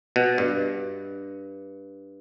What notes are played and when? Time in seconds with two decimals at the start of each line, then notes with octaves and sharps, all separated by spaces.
0.16 B2
0.38 G2